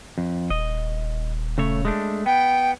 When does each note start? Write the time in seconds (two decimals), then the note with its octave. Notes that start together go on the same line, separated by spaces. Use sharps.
0.18 F2
0.50 D#1 D#5
1.58 C#3 A3 C#5
1.85 G#3 A3 D4
2.26 B3 G5